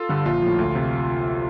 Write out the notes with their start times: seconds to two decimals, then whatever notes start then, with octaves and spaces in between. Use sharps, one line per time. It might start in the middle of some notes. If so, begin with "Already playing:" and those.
Already playing: F4 A4
0.09 G2 D3 G3
0.25 A#1 F4
0.42 A2 F3
0.59 D2
0.75 C3